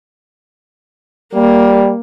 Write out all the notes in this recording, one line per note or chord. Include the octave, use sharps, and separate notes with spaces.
G3 A#3